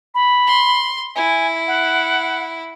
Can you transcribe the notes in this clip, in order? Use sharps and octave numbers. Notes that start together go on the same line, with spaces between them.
B5
C6
E4 G#5
F#5